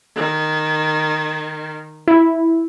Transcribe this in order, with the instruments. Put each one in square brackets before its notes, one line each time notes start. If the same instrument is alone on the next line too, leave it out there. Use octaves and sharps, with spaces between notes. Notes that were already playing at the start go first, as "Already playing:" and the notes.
[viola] D#3
[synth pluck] E4